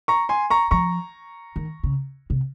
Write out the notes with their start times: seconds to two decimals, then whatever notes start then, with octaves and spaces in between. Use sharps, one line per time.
0.08 A#5 C#6
0.29 G#5 C6
0.50 A#5 C#6
0.71 F3 A#5 C#6
1.56 D#3
1.83 C#3
2.30 C3